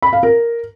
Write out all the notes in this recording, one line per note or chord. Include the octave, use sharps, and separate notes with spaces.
B5
F5
A#4